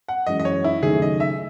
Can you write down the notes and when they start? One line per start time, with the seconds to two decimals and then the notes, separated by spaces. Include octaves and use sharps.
0.08 F#5
0.27 F#2 E3 G#3 C#4 D#5
0.40 D#5
0.45 C#5
0.64 E4
0.82 D#2 C#3 F#3 A3 G#4
1.02 D#5
1.20 E5